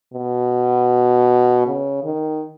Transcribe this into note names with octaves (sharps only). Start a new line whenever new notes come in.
B2
C#3
D#3